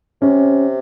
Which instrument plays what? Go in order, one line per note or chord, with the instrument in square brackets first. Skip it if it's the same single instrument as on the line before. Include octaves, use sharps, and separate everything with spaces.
[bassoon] C3 [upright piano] C#4